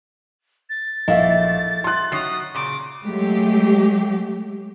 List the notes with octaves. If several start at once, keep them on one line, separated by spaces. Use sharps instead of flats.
A6
A#1 A3 A#3 E4 D#5 F5
C6 F#6
D#3 F#3 C#4 D#6 C7
A#2 C#3 D6
F#3 G#3 A3 G4